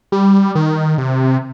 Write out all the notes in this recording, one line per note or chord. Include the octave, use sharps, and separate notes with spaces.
G3
D#3
C3